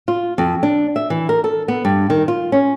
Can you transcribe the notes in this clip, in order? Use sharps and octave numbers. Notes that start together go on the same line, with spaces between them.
F4
F2
D4
E5
E3
A#4
A4
B3
G2
D#3
F4
C#4